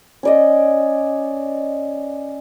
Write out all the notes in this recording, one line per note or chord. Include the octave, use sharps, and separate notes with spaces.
C#4 D5 D#5